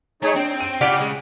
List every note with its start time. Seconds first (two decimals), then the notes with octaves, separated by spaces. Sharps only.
0.22 A3 D#4 G#4 C#5
0.36 C4 D4 G5
0.60 D7 D#7
0.81 C#3 F4 G4 D5 F#5 B6
1.00 G#3